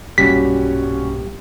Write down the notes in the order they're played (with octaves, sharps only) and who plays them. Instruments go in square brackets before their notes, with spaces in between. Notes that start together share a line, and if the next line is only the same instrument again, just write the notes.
[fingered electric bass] B1 G2 A#2 [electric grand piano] G3 C#4 F#4 [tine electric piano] G4 [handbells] B6